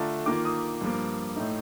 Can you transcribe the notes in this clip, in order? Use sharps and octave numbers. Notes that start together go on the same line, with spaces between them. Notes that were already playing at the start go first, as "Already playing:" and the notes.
Already playing: D3 A3 D4 F4 A5 A#5
D#3 A#3 F4 D6
D#6
G2 F3 A#3
A2 A3 D#4